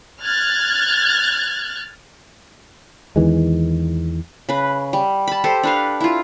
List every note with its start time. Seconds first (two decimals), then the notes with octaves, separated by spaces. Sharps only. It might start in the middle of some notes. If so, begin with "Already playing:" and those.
0.22 F6 F#6 G#6 A6
3.16 E2 D#3 E3 G#3
4.49 C#3 B4
4.93 G3
5.27 A5 B5
5.44 G4 A4 C5
5.63 D4 B4 F5
6.01 E4 F4